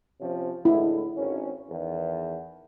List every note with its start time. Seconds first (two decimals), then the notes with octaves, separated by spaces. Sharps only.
0.20 C3 F3 C#4
0.65 A2 D3 G#3 E4
1.17 G#1 C#4
1.70 E2 D#3